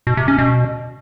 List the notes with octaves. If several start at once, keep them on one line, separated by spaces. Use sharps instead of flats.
B2
C3
C#4
B2